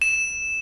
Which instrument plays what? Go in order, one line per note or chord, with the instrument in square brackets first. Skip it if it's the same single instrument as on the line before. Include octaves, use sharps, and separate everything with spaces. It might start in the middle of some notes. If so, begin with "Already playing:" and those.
[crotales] E7